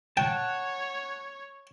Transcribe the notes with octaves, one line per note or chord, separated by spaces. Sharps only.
C#5 F#5 G5 A5